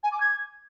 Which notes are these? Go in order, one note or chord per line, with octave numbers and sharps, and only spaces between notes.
G#5
D6
G#6